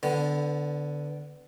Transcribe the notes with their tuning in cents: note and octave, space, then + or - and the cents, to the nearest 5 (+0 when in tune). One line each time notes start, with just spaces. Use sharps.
D3 -5 B3 +15